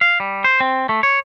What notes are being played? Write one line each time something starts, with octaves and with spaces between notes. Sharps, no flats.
F5
G3
C5
C4
A3
C#5